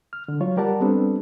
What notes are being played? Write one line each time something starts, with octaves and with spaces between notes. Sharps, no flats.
F6
D3
F#3 F4 C#5
G3 G4 A#4 D5 F#5 A5
G3 B3 C4 D4 A4